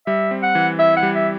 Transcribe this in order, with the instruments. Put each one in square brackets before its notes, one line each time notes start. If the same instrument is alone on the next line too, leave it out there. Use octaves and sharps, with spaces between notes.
[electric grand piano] G3 [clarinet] E5
[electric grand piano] C4
[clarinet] F#5
[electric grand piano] E3
[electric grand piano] E4 [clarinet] E5
[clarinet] F#5
[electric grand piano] G3
[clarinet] E5